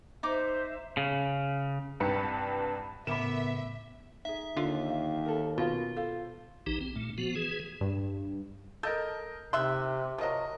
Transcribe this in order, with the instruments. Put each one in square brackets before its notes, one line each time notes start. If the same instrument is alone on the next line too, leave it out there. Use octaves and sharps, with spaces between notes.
[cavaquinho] D#4 D6 [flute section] C5 E5
[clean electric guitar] C#3
[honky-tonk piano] C2 G2 G4 B4 A5 C#7
[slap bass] A2 C#3 [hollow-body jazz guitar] B3 A#4 [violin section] E5 [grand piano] B5 D6 E7
[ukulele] D#4 G#4 [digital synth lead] E5
[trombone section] D#2 [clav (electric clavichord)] D3 F4
[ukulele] C5 F5
A4 A#4
[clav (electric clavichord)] B2 [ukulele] C#4 A#4 F5 [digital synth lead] F4
[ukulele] A4 C5 F5
[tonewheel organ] A#1 E3 D#4 G4
C4
A#2 A3
F3 B3 F#4
E3 G#4
[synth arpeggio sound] G2
[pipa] A4 [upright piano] A#4 D#5 G6
[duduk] C3 [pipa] D#3 E5 C6 [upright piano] F#6
[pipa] F3 F#3 [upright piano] A#4 D#5